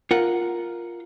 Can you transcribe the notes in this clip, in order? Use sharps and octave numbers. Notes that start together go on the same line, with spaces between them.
F4 A#4 F#5